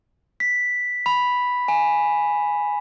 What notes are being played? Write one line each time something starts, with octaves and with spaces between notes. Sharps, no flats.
B6
B5
G#5